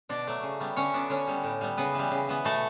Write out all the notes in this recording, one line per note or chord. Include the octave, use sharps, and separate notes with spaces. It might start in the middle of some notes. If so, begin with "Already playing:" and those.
B2 D4 D5
F#3 A3
C#3
G3 B3
D3 C#4 C#5
F#3 B3 D4 D5
D3 C#4 C#5
G3 B3
A2
G3 B3
C#3 B3 B4
E3 G3
C#3
E3 B3
B2 A3 A4